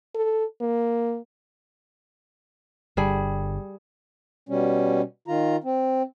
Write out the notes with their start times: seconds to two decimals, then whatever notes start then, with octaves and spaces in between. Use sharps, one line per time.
0.15 A4
0.61 A#3
2.97 G1 D3 G3 G#4
4.49 B2 G3 C#4
5.28 D#3 F4 A#5
5.64 C4